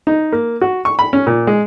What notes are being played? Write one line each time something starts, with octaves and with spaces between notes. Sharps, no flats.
D#4
A#3
F#4
C#6
B5
C#4
A#2
G#3